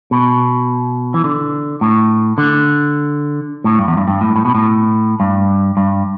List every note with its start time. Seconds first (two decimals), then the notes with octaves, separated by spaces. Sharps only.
0.11 B2
1.14 E3
1.24 D3
1.81 A2
2.38 D3
3.64 A2
3.79 G2
3.88 E2
3.97 G2
4.08 G2
4.21 A2
4.36 A2
4.45 B2
4.55 A2
5.20 G2
5.77 G2